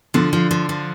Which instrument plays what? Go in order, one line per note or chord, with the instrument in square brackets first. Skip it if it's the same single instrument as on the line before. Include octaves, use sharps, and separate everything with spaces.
[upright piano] D3 [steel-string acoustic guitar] F3
[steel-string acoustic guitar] F3
F3
F3